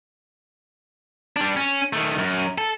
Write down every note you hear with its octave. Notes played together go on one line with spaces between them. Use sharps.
G3 D4
C#4
D#3 A3
F#2
A4